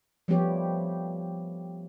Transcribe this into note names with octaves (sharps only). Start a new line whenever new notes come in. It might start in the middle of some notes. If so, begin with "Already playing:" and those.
F3 G3 A3 B3 G4 C#5